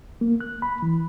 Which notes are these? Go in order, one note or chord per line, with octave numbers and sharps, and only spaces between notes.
A#3
F#6
B5
E3